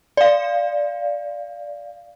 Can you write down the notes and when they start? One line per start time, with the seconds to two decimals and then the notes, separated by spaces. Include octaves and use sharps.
0.17 D5 F5